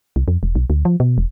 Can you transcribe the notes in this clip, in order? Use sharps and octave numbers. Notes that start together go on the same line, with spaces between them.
C2
F2
E1
B1
D2
F3
B2
E1